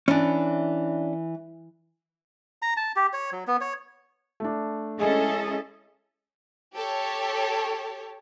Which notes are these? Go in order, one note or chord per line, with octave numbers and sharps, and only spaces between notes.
E3 C#4 D4
A#5
A5
G4
C#5
F#3
B3
C#5
A3 D4
G#3 C#4 E4 G#4 A4 D#5
G4 A4 C#5